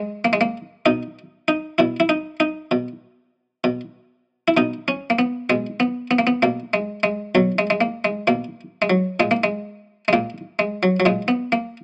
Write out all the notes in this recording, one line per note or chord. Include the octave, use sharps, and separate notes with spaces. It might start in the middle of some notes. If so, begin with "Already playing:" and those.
Already playing: G#3
A#3
G#3
A#3
B2 D#4
D#4
B2 E4
E4
D#4
D#4
B2
B2
E4
B2 D#4
C#4
A#3
B3
B2 G#3
B3
B3
A#3
B3
B2 A#3
G#3
G#3
B2 F#3
G#3
G#3
A#3
G#3
B2 A#3
G#3
F#3
A#2 G#3
A#3
G#3
G#3
A#2 A#3
G#3
F#3
F#3
A#2 G#3
B3
A#3